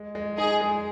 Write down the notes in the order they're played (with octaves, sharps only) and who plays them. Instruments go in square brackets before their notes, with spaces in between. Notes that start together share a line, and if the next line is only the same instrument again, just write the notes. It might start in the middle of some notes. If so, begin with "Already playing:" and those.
Already playing: [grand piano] G#3
G#3
[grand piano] D#4 [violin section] G#4
[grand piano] G#3